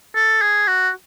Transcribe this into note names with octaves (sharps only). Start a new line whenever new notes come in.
A4
G#4
F#4